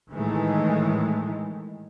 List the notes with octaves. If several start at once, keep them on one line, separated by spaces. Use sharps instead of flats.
A2 D#3 E3 G#3 A3